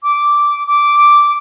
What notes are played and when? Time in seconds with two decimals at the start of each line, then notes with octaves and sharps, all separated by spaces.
0.03 D6
0.68 D6